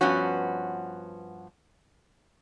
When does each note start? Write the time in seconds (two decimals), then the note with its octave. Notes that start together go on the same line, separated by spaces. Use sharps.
0.01 G2 F3 B3 C#4 F#4